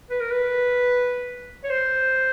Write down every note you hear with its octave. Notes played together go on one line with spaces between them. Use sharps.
B4
A#4
B4
C#5
C5